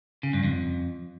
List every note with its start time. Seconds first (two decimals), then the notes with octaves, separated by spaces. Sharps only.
0.23 C#3
0.33 G2
0.44 F2